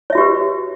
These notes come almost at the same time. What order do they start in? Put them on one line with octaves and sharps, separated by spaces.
C#5 E5 F#4 G4 B4